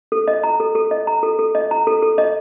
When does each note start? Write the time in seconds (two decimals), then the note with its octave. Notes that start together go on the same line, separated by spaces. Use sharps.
0.12 A4
0.28 D#5
0.43 A#5
0.60 A4
0.75 A4
0.91 D#5
1.07 A#5
1.23 A4
1.39 A4
1.55 D#5
1.71 A#5
1.87 A4
2.02 A4
2.18 D#5